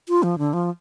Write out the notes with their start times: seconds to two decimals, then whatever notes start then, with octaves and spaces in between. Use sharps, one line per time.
0.09 F4
0.23 F3
0.39 D3
0.53 F3